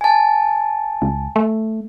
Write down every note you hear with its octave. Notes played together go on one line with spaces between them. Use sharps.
G#5 A5
C#2
A3